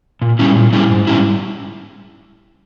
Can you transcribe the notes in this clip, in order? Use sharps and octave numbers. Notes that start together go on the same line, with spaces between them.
A#2
G3 C#4 E4
A#2
G3 C#4 E4
G#2
G3 C#4 E4